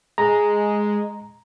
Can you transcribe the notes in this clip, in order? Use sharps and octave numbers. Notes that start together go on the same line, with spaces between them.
G#3 A#5